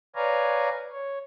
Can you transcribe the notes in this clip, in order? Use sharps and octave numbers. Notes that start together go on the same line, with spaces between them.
B4 C#5 D5 F5 G#5 A#5
C#5